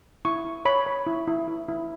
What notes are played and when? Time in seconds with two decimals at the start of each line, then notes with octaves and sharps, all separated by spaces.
0.25 E4 C#6
0.45 E4
0.65 C#5 B5
0.86 C#5
1.06 E4
1.27 E4
1.48 E4
1.68 E4